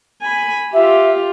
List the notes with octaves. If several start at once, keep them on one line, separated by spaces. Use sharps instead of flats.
G#5 B5
F4 G4 E5